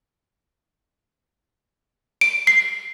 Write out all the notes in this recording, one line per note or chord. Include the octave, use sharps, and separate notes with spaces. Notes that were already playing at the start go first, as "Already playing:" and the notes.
D7
C7